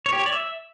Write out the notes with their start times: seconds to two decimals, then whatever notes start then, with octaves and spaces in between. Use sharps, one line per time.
0.06 C#5
0.13 G4
0.19 C#5
0.26 D5
0.33 E5